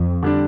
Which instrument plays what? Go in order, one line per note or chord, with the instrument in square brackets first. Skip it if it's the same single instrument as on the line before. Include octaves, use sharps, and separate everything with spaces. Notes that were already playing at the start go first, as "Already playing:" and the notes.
Already playing: [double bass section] F2
[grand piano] D3 G3 D4